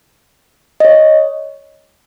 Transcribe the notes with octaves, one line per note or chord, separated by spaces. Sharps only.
D#5
C#5